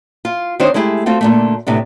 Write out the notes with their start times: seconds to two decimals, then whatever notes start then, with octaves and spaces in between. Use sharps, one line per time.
0.25 F4
0.60 D#3 C4 D4 C5 C#5 D#5
0.74 G#3 A3 E4 G4 G#4
1.06 A3 C4 F4 F#4
1.21 A#2 D3 A3
1.67 A2 C3 B3 D4